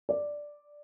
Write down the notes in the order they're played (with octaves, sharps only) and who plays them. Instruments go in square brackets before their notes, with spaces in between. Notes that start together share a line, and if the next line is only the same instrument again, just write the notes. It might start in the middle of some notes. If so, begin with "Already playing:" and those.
[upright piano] D5